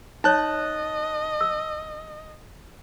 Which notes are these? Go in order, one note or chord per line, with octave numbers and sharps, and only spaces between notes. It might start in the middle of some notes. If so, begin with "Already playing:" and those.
D#4 C#5 D#5 A5 F#6
E6